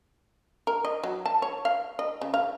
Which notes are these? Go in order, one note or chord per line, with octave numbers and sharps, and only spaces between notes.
A#4
D#5
F#3
A5
C#5
F5
D#5
C#3
F5